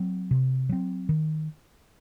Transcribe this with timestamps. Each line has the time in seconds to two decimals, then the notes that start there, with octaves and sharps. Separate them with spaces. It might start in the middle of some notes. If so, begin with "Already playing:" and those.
Already playing: F#3 C4
0.31 C3
0.69 F#3 C4
1.09 D#3